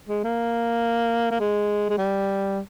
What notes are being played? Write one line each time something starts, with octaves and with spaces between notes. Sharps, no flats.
G#3
A#3
A#3
G#3
G#3
G3